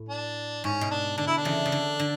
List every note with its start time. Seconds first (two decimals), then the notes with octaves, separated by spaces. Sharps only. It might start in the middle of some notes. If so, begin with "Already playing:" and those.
Already playing: A2
0.09 D4
0.64 G#2 C#4
0.81 B2
0.91 D4
1.18 D3 D4
1.27 E4
1.37 D4
1.45 C#3 E3
1.66 C#3
1.72 D3
1.99 D3